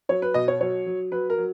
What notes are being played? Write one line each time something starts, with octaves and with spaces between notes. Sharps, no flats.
F#3 C#5
B4
B2 D#5
C#5
F#3 C#5
F#3
F#3 B4
A#4
F#3